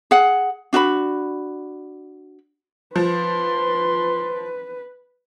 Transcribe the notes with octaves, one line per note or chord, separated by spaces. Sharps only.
G#4 F#5
D4 F#4 D#5 B5
F3 B4 C6